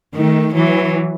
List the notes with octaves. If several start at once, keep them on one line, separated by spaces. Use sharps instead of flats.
D#3 A3
E3 F#3